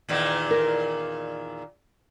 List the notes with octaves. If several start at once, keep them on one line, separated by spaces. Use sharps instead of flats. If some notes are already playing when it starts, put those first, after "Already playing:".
E2 A#2 D#3
A#4